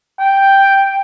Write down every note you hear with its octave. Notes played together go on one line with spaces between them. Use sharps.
G5